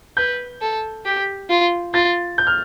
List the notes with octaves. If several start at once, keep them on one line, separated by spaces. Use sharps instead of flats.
B4 G6
A4
G4
F4
F4 A6
G6
F6